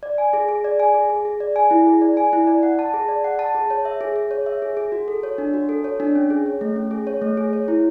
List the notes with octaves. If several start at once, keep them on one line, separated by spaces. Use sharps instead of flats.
D5
G#5
G#4
G#4
D5
G#5
G#4
G#4
G#4
D5
G#5
E4
G#4
D5
G#5
E4
D5
F#5
A5
G#4
D5
F#5
A5
G#4
C#5
E5
G#4
G#4
C#5
E5
G#4
G#4
F#4
A4
C#5
D4
F#4
A4
C#5
D4
C#4
G#4
C#5
A3
C#4
G#4
C#5
A3
G#4
C#5
E4